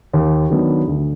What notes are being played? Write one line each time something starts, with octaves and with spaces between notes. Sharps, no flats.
D#2
D#3 F#3 B3 D4
D2